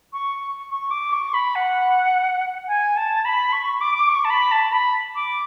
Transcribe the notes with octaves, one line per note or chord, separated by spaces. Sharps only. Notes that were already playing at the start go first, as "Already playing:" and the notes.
C#6
C#6
D6
C#6
B5
F#5
G#5
A5
B5
C#6
D6
C#6
A5
B5
A5
B5
D6